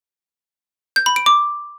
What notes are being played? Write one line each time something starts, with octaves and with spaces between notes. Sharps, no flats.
G6
B5
D7
D6